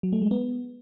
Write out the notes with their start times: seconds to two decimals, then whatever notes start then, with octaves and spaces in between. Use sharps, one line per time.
0.03 F#3
0.13 A3
0.22 G#3
0.31 B3